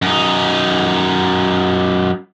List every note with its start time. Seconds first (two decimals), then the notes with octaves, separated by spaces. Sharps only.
0.02 F#2 D#4